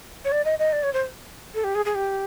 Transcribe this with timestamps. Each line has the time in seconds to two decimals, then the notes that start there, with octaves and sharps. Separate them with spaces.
0.24 C#5
0.32 D5
0.45 D#5
0.59 D#5
0.72 D5
0.83 C#5
0.93 C5
1.54 A4
1.64 G4
1.75 G#4
1.85 G#4
1.95 G4